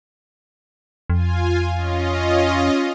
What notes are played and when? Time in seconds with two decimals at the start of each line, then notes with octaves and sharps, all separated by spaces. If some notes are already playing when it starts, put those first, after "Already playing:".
1.10 F2 F4 G#5
1.75 C#4 F4 D#5